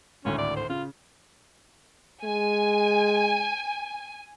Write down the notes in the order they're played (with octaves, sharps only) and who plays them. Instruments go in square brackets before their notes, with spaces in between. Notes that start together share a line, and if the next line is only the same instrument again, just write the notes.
[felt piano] G#1 D2 A2 [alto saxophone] C#4
[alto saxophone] D5
C5
[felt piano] C#3 [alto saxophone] F4
[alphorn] G#3 [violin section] G#5